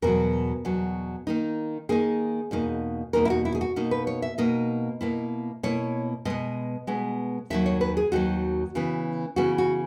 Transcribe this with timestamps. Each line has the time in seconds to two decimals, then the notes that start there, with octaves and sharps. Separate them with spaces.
0.02 E2 B2 F#3 A#4
0.65 E2 B2 F#3
1.27 D#3 A#3 D#4
1.89 D#3 A#3 D#4 G#4
2.51 E2 B2 A#3 D#4
3.13 E2 B2 A#3 D#4 A#4
3.25 E4
3.30 F#4
3.45 E4
3.55 G#4
3.61 F#4
3.76 B2 A#3 D#4
3.91 B4
4.07 C#5
4.22 E5
4.38 B2 A#3 D#4 D#5
5.01 B2 A#3 E4
5.63 B2 A#3 E4 C#5
6.25 B2 G#3 B3 D#5
6.87 B2 G#3 B3
7.50 D#2 D#3 F#3 E5
7.66 C#5
7.81 B4
7.97 G#4
8.12 D#2 D#3 F#3 F#4
8.75 C#3 E3 B3
9.36 C#3 E3 B3 F#4
9.58 F#4